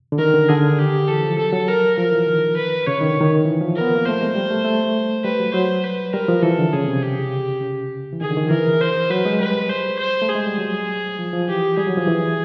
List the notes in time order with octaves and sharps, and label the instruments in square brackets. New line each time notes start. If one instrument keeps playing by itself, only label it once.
[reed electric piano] D3
[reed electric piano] D#3 [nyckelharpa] A#4
[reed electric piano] D3
[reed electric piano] D3 [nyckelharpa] G#4
[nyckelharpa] G4
[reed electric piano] E3 [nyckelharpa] A4
[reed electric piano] F3
[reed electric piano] F#3 [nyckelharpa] A4
[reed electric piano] F#3
[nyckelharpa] A#4
[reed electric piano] F3 [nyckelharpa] A#4
[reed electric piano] E3
D#3
[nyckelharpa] B4
[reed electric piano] C#3 [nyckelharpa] C#5
[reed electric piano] D#3
D3
D#3
E3
F3
[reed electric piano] B3 [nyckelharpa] A#4
[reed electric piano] A#3
[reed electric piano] A3 [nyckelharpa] C5
[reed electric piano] G#3
G3
A3
A3
[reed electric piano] G3 [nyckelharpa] B4
[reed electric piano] F#3
[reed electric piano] F#3 [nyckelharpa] C5
[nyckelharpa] B4
[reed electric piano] G3 [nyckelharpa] A#4
[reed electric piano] F3
[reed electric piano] E3 [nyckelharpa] A4
[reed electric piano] D3
[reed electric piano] C#3 [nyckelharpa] G#4
[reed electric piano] C3
[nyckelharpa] G4
[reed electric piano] C#3
E3
[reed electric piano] D#3 [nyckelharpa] G#4
[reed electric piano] D3
D#3
F3
[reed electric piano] E3 [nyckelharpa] A#4
[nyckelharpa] C5
[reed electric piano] F#3 [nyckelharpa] B4
[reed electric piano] G#3
[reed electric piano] G3 [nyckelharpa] B4
[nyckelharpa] C5
C5
[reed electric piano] A3
[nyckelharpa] G#4
[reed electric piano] G#3
G3
F#3
F3
F3
[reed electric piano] E3 [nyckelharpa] G4
[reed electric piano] G3 [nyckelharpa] G#4
[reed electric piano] F#3
F3
E3